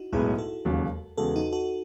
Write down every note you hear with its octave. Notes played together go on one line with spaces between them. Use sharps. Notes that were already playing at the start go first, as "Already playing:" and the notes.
Already playing: D#4 E4 F#4
B1 A2 G#3 B3 E4 G#4
F#4 A4
E1 D#2 C#3 F#3
E2 C#3 G#3 F#4 A4
D#4 F#4
F#4 A4